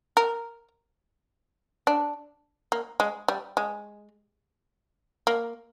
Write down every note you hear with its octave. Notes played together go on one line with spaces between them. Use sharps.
A#4
D4
A#3
G#3
G3
G#3
A#3